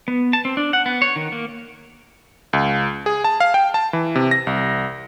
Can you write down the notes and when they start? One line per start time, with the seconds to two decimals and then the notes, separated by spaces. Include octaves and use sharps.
0.08 B3
0.33 A5
0.45 C4
0.57 D4
0.73 F#5
0.86 B3
1.02 C#5
1.16 D#3
1.32 A#3
2.53 C#2
3.06 G#4
3.24 A5
3.40 F5
3.54 G5
3.74 A5
3.93 E3
4.15 C3
4.31 A#6
4.47 C2